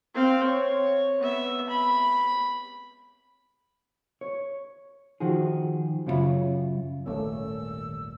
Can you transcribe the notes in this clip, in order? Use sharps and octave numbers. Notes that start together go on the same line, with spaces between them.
C4 F5
C#5
B3 E5
B5
C#5
D#3 F3 F#4 G#4
F#2 C#3 E4 F4 E5 B5
D#1 G#1 A#2 D#3 A3 C#4 E6